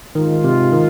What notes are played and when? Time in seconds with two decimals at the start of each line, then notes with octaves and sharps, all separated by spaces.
0.15 G#2 D#3 G#3 F4
0.44 C3
0.72 D#3